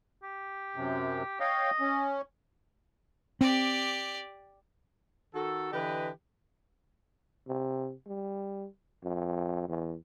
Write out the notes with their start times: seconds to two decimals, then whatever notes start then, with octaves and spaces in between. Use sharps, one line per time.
0.23 G4
0.76 F#2 C3
1.40 C#5 D#5 F5 G5
1.80 C#4
3.41 C4 G4 D5
5.34 D#3 F#4 A4
5.72 D3 E3 G4 B4 D#5
7.47 C3
8.07 G3
9.04 F2
9.68 E2